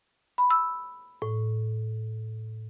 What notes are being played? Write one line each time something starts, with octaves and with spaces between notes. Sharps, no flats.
B5
E6
A2